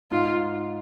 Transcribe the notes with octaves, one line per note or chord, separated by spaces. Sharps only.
G#2 F4